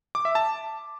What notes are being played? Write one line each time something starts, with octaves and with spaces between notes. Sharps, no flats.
D6
E5
A5